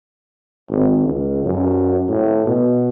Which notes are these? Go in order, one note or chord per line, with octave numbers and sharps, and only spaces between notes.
G#1
C#2
F#2
A2
B2